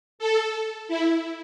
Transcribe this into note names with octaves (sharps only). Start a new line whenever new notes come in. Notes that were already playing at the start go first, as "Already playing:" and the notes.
A4
E4